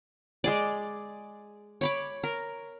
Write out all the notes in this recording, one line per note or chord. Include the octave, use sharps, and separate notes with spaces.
G#3 G#4 D5
C#5 B5 D6
A#4